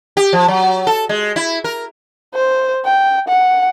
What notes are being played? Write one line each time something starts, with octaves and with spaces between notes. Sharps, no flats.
G4
F3
F#3
A4
G#3
E4
A#4
C5
G5
F#5